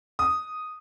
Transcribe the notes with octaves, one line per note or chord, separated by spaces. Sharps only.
D#6